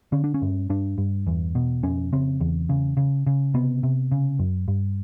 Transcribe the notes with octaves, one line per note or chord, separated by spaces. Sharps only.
D3 C#4
D4
C#4
G2
G2 D4
G2
E2
B2
F2 C#4
C#3 C4
E2
C#3
C#3
C#3
C3 B3
C3
C#3
F#2
G2